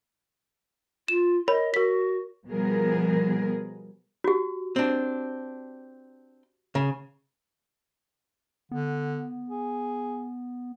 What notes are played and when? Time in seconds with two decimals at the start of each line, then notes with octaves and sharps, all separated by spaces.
1.08 F4 E7
1.48 A#4 C#5 D#5 B5
1.74 F#4 A#4 B6
2.49 B2 F3 G3 B3 G#4 A#4
4.24 F#4 G4
4.76 C4 D4
6.75 C#3
8.71 D3 B3
9.50 G#4